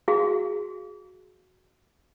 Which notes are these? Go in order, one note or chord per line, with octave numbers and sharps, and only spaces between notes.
F#4 G#4 F5